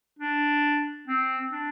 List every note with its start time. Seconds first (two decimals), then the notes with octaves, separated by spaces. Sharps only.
0.19 D4
1.08 C4
1.51 D4